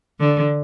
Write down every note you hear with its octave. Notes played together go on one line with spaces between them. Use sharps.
D3